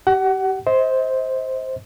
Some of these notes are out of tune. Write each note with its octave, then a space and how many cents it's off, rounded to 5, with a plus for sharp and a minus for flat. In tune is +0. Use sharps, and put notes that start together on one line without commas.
G4 -25 F#5 +25
C5 +0 D#5 +40